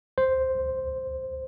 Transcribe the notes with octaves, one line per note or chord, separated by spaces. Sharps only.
C5